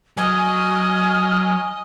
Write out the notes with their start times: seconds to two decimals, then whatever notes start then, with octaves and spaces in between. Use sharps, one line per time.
0.17 F#3 D#5 G#5 F6